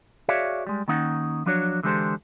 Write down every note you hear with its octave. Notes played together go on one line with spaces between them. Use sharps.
F#4 G#4 C#5 D5 E5 F5
G3 G#3
D#3 A#3 C#4 D#4 F#5
F3 F#3 D4 F#4 C#5
D3 E3 G#3 G4 A4 C5